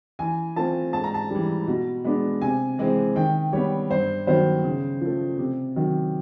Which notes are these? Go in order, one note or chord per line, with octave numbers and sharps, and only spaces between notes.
E3 G#5
A3 C4 F4 A5
G#2 A5
A#5
A5
E3 G3
B2
G#3 B3 D4
C3 G#5
E3 G#3 C4
D#3 G5
G3 B3 C#5
G2 C5
D#3 F#3 B3 C5
C#3
F3 A3
C3
D#3 F#3